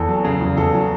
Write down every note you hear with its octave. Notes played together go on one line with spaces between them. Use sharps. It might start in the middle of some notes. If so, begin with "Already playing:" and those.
Already playing: E2 A4
F#3
C#3
E2
E2 A4
F#3